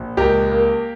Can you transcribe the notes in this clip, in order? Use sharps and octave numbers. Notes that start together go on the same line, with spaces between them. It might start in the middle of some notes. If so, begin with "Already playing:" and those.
Already playing: A#1
C#2 G4 A#4
A#3